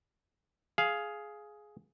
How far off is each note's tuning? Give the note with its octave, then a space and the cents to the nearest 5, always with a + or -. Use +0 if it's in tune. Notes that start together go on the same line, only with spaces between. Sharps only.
G#4 +10 F5 +0